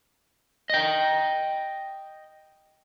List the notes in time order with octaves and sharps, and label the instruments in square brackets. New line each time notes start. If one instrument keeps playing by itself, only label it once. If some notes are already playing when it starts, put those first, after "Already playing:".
[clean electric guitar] D#5 G5